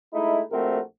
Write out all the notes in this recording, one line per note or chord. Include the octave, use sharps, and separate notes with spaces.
G#3 A3 D#4 E4
A#1 A3 C4 F#4 A#4